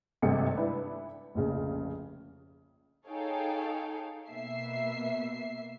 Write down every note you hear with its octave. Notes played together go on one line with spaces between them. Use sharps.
G#1 G2 C3 A3 C#7
D4 E4 B4
F1 A#1 C#3
D#4 G#4 A4 C#5 F5 G5
B2 A#3 E5 C7